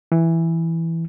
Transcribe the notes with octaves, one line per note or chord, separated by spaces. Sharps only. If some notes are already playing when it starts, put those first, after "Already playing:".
E3